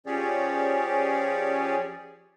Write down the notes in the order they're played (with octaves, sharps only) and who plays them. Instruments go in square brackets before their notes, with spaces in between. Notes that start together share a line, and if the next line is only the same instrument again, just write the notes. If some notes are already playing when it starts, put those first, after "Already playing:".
[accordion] F3 C#4 G4 G#4 C#5 D5